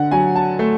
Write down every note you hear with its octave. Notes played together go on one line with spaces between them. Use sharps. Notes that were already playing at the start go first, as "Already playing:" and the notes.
Already playing: D3 F#5
F#3 G#5
A5
A3